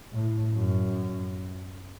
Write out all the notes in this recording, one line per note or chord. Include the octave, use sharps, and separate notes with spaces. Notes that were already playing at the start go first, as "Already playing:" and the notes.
A2
F#2